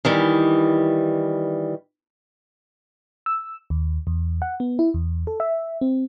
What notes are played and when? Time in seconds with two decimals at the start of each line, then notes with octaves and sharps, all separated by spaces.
0.05 D#3 E3 G3
3.26 E6
3.70 D#2
4.07 E2
4.42 F#5
4.60 B3
4.79 E4
4.94 E2
5.27 A4
5.40 E5
5.81 C4